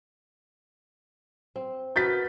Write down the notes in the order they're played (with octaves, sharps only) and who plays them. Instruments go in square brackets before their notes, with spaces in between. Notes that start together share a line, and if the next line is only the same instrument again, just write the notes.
[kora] C4
[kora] F#4 A#4 B4 [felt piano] G6 A6 B6